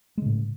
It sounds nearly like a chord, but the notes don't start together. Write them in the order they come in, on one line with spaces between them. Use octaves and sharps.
G#3 C#3 A2